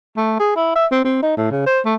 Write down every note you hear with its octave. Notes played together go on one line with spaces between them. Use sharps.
A3
G#4
E4
E5
C4
C4
D#4
A2
C#3
C5
A3